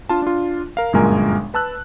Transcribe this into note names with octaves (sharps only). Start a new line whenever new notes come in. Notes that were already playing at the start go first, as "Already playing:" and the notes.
D4 F4 A5
D4 F4
A#4 F5
G1 F#2 A#2 G#3 A#4 G#5
B4 A5 E6 F#6